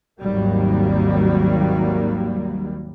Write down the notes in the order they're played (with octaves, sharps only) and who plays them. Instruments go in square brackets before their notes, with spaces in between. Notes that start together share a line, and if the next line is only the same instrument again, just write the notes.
[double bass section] G#1 D#2 D#3 F#3 G3 A#3